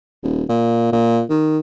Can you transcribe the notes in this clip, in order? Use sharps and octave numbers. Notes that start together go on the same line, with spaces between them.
D#1
A#2
A#2
D#3